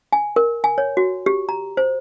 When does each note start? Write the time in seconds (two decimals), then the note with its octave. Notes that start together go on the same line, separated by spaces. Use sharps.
0.13 G#5
0.36 A#4
0.64 G#5
0.78 C#5
0.97 F#4
1.26 G4
1.49 A#5
1.77 C5